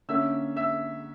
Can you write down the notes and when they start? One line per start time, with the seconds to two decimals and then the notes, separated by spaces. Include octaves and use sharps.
0.09 D3 A#3 C#4 E5 E6
0.56 E5 E6